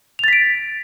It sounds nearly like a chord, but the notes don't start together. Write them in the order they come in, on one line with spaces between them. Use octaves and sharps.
F7 A6 B6 D7